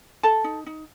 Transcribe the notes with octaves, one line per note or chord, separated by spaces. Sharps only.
A4 A5
D#4
D#4